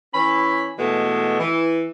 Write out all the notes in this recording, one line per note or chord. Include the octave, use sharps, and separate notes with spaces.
E3 C#4 B5
B2 E3 G#3 A3
E3